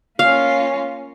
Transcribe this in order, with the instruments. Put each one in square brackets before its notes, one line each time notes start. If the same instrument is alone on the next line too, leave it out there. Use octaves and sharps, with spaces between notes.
[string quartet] A#3 C#4 F4 [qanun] F5